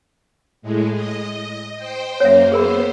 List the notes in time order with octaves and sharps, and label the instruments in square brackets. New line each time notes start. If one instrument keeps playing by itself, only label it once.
[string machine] A2 G#3
D#5
C5 G5
[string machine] F#2 A#3 [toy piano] C#5 E5
[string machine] B3 C5 [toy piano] G#4 A#4 B5